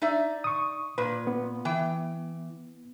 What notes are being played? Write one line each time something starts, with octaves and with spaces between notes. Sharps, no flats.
D#4 D5 E5
C#6 D#6
A#2 B4
B3
E3 G5